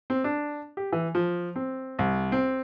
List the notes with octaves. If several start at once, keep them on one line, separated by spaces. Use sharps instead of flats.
C4
D4
G4
E3
F3
C4
C2
C4